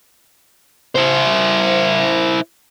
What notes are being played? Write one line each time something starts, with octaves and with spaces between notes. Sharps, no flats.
E4 C5